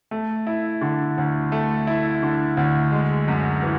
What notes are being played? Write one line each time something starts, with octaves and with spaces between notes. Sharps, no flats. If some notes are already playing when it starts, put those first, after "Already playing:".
A3
E4
D3
D2
A3
E4
D3
D2
G#3
F#2
E3